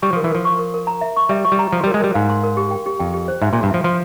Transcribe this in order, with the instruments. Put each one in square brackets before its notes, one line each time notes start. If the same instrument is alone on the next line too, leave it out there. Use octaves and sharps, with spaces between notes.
[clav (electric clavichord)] G3 [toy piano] C#6
[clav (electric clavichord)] F3
[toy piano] A#4
[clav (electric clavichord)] E3
[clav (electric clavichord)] F3 [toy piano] A#4
[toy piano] C#6
A#4
A#4
A#5
E5
C#6
[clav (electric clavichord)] G3 [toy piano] E5
[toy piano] C#6
[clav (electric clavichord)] G3
[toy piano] A#5
[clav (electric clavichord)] F3 [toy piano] C6
[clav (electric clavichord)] G3
[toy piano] A#4
[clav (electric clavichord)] G#3
[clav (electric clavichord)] G3 [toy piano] A#4
[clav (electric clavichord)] G#2 [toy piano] F5
[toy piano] C6
A#4
G4
G5
G4
[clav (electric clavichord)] F2 [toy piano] G5
[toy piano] G4
C5
[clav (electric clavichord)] G#2 [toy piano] E5
[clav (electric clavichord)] A#2
[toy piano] C6
[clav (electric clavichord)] G2
[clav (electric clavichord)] F3 [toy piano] E5
[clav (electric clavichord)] F3 [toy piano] C6